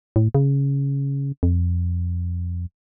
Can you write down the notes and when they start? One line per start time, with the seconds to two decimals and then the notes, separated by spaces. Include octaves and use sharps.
0.16 A2
0.35 C#3
1.43 F2